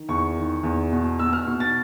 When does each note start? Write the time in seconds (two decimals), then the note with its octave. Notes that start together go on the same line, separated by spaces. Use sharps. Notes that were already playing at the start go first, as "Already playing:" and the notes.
Already playing: D#3
0.09 E2 C#6
0.36 D#3
0.63 E2
0.92 B2
1.19 B2 E6
1.33 F6
1.47 B2
1.60 A6